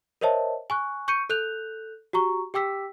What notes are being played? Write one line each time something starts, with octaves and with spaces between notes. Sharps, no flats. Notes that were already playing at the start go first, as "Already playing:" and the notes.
A#4 C5 C#5 D#5 E5 A5
G#5 C#6 F#6
C#6 G6 C#7 D#7
A4 F#6 G6 F7
F#4 G4 A#5 C#6
G4 G5 D6 E6 B6